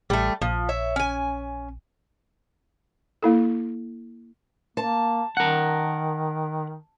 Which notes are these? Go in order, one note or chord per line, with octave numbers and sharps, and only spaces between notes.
A1 G3 A3
A#1 F3
C#5 E5
C#4 G#5
A#3 E4 A4
A#3 A5
D#3 A#4 F#5